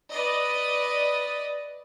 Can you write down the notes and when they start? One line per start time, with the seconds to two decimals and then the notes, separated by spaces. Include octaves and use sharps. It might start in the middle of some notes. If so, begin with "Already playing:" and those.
0.12 B4 D5 D#5